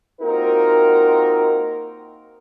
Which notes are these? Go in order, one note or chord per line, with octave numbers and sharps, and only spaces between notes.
A#3 C4 D#4 F4 F#4 A#4